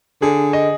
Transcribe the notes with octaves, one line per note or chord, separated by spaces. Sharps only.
D3 G#4
D#5